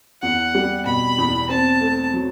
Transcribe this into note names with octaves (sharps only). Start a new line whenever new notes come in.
E2 F#5
G3
B2 B5
E2
C4 A5
A3
F#3